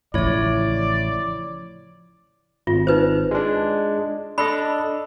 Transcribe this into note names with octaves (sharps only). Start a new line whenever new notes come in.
A1 C#3 F3 E4 C#5 D5
G#1 F4
D#4 B4 C5
G#3 D4
D4 A4 D#5 B5